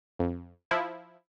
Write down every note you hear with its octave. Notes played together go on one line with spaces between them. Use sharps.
F2
F3 E4